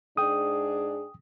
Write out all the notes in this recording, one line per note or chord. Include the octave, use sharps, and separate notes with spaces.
G#2 D4 G#4 G5 D#6